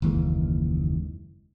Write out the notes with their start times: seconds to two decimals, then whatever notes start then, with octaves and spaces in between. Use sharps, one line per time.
0.02 F#1 D#2 E3 G#3